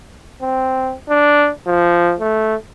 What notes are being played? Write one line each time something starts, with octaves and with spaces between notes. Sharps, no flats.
C4
D4
F3
A3